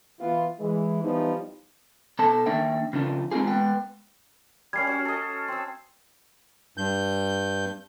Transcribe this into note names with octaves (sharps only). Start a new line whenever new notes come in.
E3 B3 F4
E3 G#3
E3 F3 G3 B3 D#4
B2 A4 A5
D#3 A#3 D4 E5 G5
C#3 F3 D4 F4
G#3 C4 D#4 F4 G#4
G#3 B3 G5
G3 A#3 C#4 G#6 C7
C#4 F#4
A4 D#5
C4 E6
G2 G6